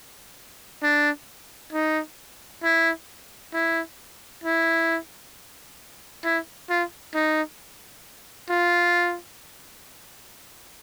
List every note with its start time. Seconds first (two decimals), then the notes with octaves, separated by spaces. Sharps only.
0.83 D4
1.73 D#4
2.64 E4
3.54 E4
4.44 E4
6.25 E4
6.70 F4
7.15 D#4
8.50 F4